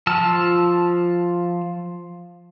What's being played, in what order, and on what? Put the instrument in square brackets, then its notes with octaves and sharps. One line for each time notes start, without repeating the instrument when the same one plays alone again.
[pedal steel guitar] F3 A5 E6 F6